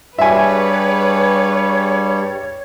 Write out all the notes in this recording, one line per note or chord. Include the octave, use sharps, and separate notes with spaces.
G2 G3 G#4 B4 C#5 E5 G#5